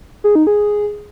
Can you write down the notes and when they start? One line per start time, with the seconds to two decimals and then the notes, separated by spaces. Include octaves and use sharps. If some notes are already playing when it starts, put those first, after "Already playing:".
0.24 G#4
0.35 D#4
0.47 G#4